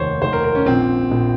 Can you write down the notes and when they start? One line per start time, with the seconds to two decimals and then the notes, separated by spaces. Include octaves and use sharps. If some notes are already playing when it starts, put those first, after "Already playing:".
Already playing: F1 D#2 D#3 C5 C#5
0.21 F1 D#2 D#3 C5
0.33 A#4
0.44 A#4
0.55 C#4
0.66 A#1 A#2 F3 C4
1.11 A#1 A#2 F3